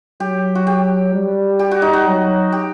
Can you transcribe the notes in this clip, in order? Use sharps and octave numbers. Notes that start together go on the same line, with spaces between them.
F#3 G4
F#4
G4
G3
G4
F#4
D#4
F#4
F#3
G4